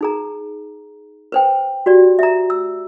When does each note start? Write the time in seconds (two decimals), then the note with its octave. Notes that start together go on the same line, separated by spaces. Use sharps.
0.01 D#4 G#4 A#5
1.32 B4 C5 G5
1.86 F#4 G4 D5
2.19 E5 A#5
2.50 E6